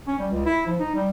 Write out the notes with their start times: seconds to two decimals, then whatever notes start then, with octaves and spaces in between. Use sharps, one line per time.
0.08 C#4
0.19 G3
0.31 C#2
0.45 E4
0.66 F3
0.80 D#4
0.95 G3